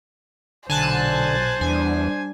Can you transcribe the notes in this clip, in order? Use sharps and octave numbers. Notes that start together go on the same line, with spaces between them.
B1 A#2 D3 C5 G#5 A5 F#6
E2 G3 D4 G#5